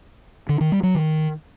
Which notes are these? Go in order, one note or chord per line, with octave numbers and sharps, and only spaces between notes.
D3
D#3
G3
F#3
D#3